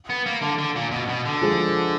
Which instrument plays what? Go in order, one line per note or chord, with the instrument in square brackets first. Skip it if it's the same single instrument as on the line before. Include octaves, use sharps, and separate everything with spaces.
[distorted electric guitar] B3
A#3
D3
D3
A#2
B2
B2
D3
[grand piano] F3 G#3